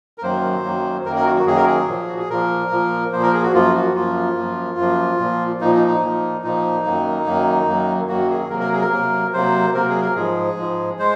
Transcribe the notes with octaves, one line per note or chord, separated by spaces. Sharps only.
A#4
F#2 D#3 F#3 A#3 C5
F#2 D#3 F#3 A#3
F#2 D#3 F#3 A#3 A#4
A#4
F#4
F#4
F#2 D#3 F#3 A#3 G#4
A#4
G#4
A#2 F3 A#3
F#4
G#4
A#2 F3 A#3 A#4
A#2 F3 A#3
A#2 F3 A#3 C5
A#4
G#4
F#4
F#2 F3 A#3 F4
F#4
F#2 F3 A#3 F4
F#2 F3 A#3
F#2 F3 A#3
A#2 F3 A#3
A#2 F3 A#3 D#4
D#4
D#4
A#2 F3 A#3
A#2 F3 A#3 D#4
F#2 D#3 F#3 A#3
F#2 D#3 F#3 A#3
F#2 D#3 F#3 A#3
F#2 D#3 F#3 A#3 F#4
G#4
C3 F#3 A#3 A#4
A#4
G#4
A#4
C3 F#3 A#3
C3 F#3 A#3 C5
C3 F#3 A#3 A#4
G#4
A#4
G#2 F3 G#3 G#4
G#2 F3 G#3
G#3 C5